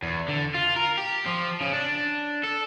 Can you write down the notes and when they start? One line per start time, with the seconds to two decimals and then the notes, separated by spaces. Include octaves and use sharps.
0.02 E2
0.28 D3
0.55 F4
0.76 A#4
0.98 G4
1.26 F3
1.61 C#3
1.73 D4
2.43 A4